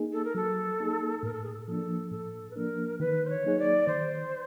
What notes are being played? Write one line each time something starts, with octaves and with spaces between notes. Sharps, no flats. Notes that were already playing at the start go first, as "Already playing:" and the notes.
Already playing: A#3 D#4 G#4
A4
A#4
F#3 A4
A#3 D#4 G#4
A2 A#4
A4
G#4
A4
F3 A#3 D4 A4
A2 A4
B4
F3 A#3 D4 A#4
D#3 B4
C5
C#5
F#3 A#3 D#4 G#4
D5
D#3 C5